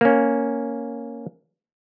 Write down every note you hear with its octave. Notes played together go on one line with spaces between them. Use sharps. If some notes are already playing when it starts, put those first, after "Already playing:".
A#3 C#4